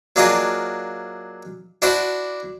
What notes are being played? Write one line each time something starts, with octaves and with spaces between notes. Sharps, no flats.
F#3 A#3 D4 F4 G#4 D#5
D4 E4 F#4 C5 D5